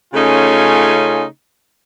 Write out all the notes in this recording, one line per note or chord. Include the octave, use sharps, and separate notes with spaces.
C#3 A3 C#4 D#4 F4 G#5